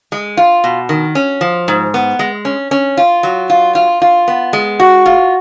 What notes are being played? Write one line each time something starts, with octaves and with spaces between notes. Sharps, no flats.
G#3
F4
B2
D#3
C#4
F3
G#2
B3
G#3
C#4
C#4
F4
F#3
F4
F4
F4
B3
G#3
F#4
F4